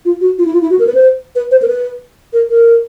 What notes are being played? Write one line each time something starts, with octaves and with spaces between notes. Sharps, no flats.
F4
F#4
F4
E4
F4
E4
F#4
A#4
B4
C5
B4
C5
A#4
B4
A#4
A#4